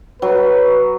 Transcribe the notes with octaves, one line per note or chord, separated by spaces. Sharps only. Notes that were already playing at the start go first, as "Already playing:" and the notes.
F#3 B4